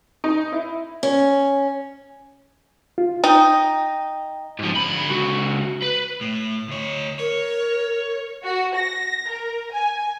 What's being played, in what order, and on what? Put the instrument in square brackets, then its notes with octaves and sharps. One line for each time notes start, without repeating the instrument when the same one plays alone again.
[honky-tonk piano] D#4
E4
[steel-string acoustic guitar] C#4
[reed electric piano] F4
[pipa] D#4 [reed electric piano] G5
[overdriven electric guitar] G#2 F3
D3 B5
C#2 F#4
B4
A2
D2 C#5
[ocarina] A#4 [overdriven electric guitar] C#5
[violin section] F#4
A#6
A#4
G#5